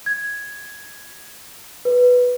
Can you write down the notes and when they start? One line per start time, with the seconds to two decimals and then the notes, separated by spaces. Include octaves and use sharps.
0.06 G#6
1.85 B4